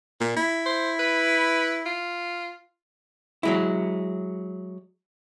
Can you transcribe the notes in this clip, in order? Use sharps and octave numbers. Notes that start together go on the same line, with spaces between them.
A#2
E4
C5
B4
F4
F#3 G#3 E4